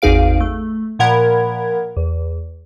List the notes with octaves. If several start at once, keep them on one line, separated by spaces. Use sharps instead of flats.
G#1 E2 D#4 G#4 F5 D7
A3
A#2 F3 A#4 F#5 B5 G#6
E2